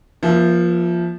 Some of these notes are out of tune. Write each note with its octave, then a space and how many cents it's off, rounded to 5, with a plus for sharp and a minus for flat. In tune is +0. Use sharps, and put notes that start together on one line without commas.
F3 -5 A#3 +40 E5 +0